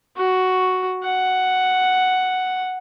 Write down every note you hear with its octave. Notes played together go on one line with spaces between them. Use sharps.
F#4
F#5